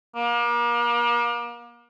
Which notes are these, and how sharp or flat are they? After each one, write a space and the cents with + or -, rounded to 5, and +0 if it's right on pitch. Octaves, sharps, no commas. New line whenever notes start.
A#3 +35